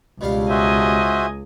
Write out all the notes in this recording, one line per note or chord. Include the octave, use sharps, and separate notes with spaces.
C#2 B2 G3 F5
F#4 C5 D#5 E5 G#5